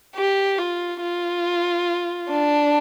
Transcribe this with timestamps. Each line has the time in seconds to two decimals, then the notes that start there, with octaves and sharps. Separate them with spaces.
0.15 G4
0.58 F4
1.01 F4
2.29 D4